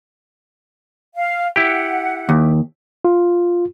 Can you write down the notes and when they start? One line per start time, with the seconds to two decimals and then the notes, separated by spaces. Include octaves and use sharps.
1.16 F5
1.56 E4 G4 F#5
2.29 D#2
3.05 F4